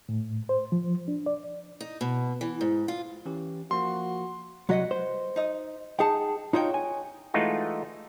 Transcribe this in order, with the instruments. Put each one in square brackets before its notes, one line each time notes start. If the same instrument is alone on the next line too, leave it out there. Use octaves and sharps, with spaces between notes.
[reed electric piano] A2
C5
F3
D4
D5
[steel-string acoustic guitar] D#4
B2
E3
G#2
F4
[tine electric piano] E3 C#4 G4
[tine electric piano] F3 A#3 [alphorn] F#4 [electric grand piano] C6
[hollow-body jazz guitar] C2 F#3 F#4 [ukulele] B4 D#5 F#5
[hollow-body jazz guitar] C5
[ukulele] D#4 D#5
[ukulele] D#4 F#5 A5 [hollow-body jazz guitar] G#4 G5
[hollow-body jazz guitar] D#4 F4 D#5 [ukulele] F#4 C#5 G5
[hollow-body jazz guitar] G#5
[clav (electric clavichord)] E3 G#3 A3 D#4 F4 F#4